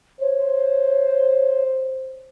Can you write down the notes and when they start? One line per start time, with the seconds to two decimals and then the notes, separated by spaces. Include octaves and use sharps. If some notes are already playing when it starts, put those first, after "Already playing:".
0.21 C5 C#5